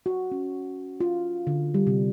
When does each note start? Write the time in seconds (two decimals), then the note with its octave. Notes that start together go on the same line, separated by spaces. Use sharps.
0.06 F#4
0.32 C#4
1.00 F4
1.47 D3
1.74 G3
1.87 C3